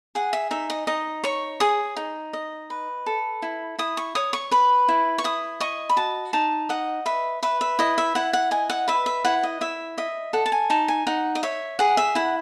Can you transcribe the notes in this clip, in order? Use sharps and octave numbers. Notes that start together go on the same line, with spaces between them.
G#4 F#5
E5
D#4 E5
D#5
D#4 D#5
C#5 C#6
G#4 D#6
D#4
D#5
B4
A4
E4
E4 D#6
C#6
C#5 D#6
C#6
B4 B5
E4
C#6
E4 D#6
D#5 C#6
B5
F#4 A5
D#4 A5
D#5 F#5
B4 E5
B4 E5
E5
E4 D#5
E5
E4 F#5
F#5
D#5 G#5
F#5
B4 E5
E5
E4 F#5
D#5
E4 E5
D#5 E5
A4 F#5
A5
G#5
D#4 A5
G#5
D#4 F#5
D#5
C#5 E5
G#4 F#5
E5
E4 F#5